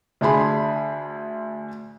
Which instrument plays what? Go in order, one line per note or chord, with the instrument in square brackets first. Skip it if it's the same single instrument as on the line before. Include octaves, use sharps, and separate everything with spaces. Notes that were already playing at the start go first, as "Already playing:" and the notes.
[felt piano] D2 D4 G#4 B5 C6